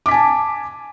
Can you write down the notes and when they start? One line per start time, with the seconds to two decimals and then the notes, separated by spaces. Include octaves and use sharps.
0.06 D6
0.08 B6
0.11 G#5
0.14 A5